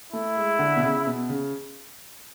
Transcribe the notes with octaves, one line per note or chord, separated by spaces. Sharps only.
A3 E4
G#3
D3
B2
C#3
B2
C#3